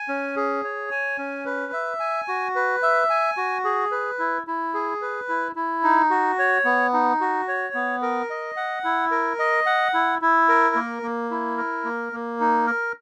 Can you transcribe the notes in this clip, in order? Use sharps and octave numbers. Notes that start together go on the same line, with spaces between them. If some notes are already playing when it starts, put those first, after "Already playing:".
Already playing: G#5
C#4
G#4
C#5
G#5
C#4
B4
E5
G#5
F#4
B4
E5
G#5
F#4
G#4
B4
E4
E4
G#4
B4
E4
E4
D#4
F#4
C#5
B3
D#4
F#4
C#5
B3
A#4
D#5
F#5
E4
A#4
D#5
F#5
E4
E4
A#4
A#3
A#3
E4
A#4
A#3
A#3
D#4
A#4